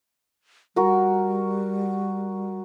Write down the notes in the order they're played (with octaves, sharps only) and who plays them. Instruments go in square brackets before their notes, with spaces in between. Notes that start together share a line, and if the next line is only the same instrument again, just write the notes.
[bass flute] G3 [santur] F#4 A#4